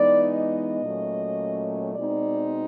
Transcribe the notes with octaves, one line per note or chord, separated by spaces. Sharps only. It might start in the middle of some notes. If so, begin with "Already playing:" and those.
Already playing: E3 G#3 B3 D#4 D5
D#5
A#2 F#3 A3 C#4
B2 G#3 C4 D#4 D5